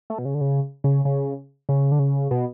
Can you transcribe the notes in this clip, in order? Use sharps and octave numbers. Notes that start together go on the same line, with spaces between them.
A3
B2
C#3
D3
C#3
C#3
C#3
C#3
D3
C#3
B2